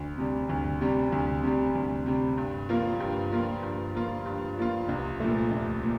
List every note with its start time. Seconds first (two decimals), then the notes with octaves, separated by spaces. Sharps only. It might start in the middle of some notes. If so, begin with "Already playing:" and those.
Already playing: D2
0.18 C3 G3
0.49 D2
0.81 C3 G3
1.12 D2
1.43 C3 G3
1.75 D2
2.06 C3 G3
2.38 G2
2.69 F3 A#3 F4
3.00 G2
3.32 F3 A#3 F4
3.63 G2
3.95 F3 A#3 F4
4.26 G2
4.58 F3 A#3 F4
4.89 C2
5.20 A#2 F3 A3
5.51 C2
5.82 A#2